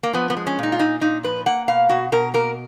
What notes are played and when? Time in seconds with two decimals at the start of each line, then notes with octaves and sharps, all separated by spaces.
0.03 A#3
0.13 F3 B3
0.30 B3
0.37 G#3
0.47 C#4
0.59 A#2 D#4
0.72 F4
0.79 A#2 D#4
1.01 A#2 D#4
1.23 F3 B4
1.46 A#3 F#5
1.68 B2 F5
1.89 B2 F#4
2.12 B2 A#4
2.34 A#3 A#4